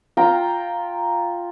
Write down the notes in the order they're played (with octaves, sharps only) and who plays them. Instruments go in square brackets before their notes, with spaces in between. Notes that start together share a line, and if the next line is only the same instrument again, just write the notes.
[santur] F4 G5 A#5